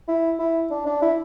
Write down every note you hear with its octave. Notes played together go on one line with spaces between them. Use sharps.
E4
E4
D4
D4
E4